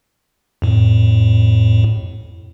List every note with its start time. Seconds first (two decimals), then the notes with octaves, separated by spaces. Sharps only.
0.62 F2 A2